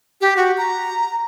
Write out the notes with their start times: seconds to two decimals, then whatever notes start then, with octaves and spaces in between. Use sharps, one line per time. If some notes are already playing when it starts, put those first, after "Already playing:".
0.21 G4
0.37 F#4
0.58 A#5